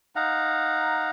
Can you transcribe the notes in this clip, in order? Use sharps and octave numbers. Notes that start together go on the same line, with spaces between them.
D#4 F5 F#5 A#5